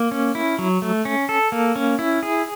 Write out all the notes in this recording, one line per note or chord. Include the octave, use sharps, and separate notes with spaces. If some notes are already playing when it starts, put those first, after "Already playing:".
Already playing: A#3
C#4
E4
F#3
A3
C#4
A4
A#3
C#4
E4
G#4